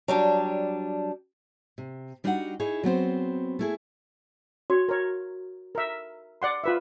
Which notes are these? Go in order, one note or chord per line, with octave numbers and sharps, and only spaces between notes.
F#3 G3 D4
C3
G3 D4 D#4 F#4 D#5 F#5
D#4 E4 G#4 C#5
F#3 B3 C4 C5
A3 E4 G#4
F#4 C#5
A#4 C#5
A#4 E5
D5 F#5 C6
F4 B4 E5